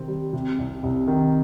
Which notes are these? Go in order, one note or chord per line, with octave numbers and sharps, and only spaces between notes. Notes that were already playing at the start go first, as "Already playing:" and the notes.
Already playing: C3 D#3 C4
G3
C3
C2
C2
D#3